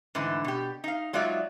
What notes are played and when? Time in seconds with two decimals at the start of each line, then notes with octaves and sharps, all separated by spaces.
0.15 G#2 D3 E3 A3
0.44 B2 G4
0.84 D#4 F5
1.13 F#3 G#3 D#4 F4 D5 E5